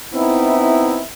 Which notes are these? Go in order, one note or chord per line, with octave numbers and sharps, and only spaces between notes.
B3 C4 D#4 E4